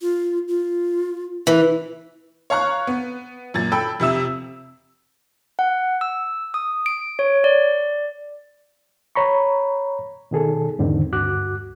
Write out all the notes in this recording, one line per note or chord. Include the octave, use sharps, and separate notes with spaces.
F4
F4
E3 B4
C#5 F5 A#5 C#6 F#6
B3
F#2 A#2 G#6 A6
A4 G5 B5 E6
F2 C3 E5 E6 E7
F#5
E6
D#6
D7
C#5
D5
C#5 A#5 B5 C#6
B2 D#3 G#4 A4
E2 G#2 D3 D#3 C4
D2 G2 F#4 D6 F#6